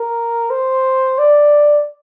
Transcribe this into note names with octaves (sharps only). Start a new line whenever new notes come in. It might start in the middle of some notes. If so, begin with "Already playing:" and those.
Already playing: A#4
C5
D5